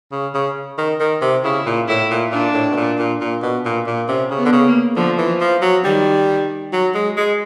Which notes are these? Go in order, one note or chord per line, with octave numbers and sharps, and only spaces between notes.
C#3
C#3
D#3
D#3
C3
C#3 E4
A#2
A2 E4
A#2
A#2 D4
A2
B2
A#2
A#2
A#2
B2
A#2
A#2
C3 C#4
C#3
B3
D3
C#3
A#3
D3 F3
E3
F3
F3
F#3
D#3 G3
F#3
G#3
G#3